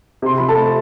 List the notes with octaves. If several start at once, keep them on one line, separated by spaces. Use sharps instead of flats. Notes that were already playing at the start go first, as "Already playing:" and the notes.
C3 C6
F3 B5
A4 A5
A3